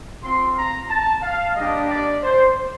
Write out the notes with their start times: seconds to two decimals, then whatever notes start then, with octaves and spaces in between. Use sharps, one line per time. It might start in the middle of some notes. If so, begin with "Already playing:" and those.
0.22 C4 F4 C6
0.56 A#5
0.89 A5
1.22 F5
1.55 G3 A#3 D4 G4 D#5
1.89 D5
2.23 C5